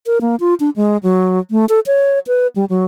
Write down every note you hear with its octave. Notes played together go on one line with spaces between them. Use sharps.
A#4
A#3
F4
D4
G#3
F#3
A3
A4
C#5
B4
G3
F#3